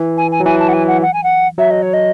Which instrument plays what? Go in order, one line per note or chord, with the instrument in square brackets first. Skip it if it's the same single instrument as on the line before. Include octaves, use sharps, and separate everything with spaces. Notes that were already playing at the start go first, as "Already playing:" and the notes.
Already playing: [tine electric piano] E3
[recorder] G#5
G#5
[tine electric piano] F#3
[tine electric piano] E3 [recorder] G#5
[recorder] A5
F#5
G#5
F#5
F#5
G#5
F#5
[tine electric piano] F#3 [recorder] E5
[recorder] D#5
C#5
D#5